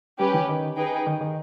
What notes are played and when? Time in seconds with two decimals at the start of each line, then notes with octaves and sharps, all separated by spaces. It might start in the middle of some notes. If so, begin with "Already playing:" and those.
0.19 G3 C#4 G4 B4
0.34 E3
0.49 D#3
0.77 D#4 G#4 B4 G5
1.06 D#3
1.21 D#3